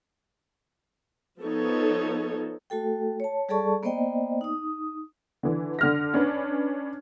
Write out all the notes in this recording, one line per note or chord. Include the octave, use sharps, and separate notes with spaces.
F3 B3 D#4 A4 C#5
A3 F#4 A4 G5
C#5 A5
G3 G#4 A4 D5 A5 C#6
A#3 B3 C5 D5 D#5 G5
D#4 D#6
D3 E3
D3 F6 A#6
C#4 D4 B4